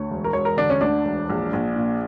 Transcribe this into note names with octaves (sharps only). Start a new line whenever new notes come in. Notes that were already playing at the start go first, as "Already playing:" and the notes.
Already playing: D2 C#5
E1
A#4
E1 C#5
A#4
D3 D4
C#4
D2 D4
E1
A#1
A#1
A#2